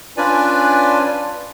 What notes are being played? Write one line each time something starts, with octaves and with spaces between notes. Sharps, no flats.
C#4 D4 F4 B4 D5 G#5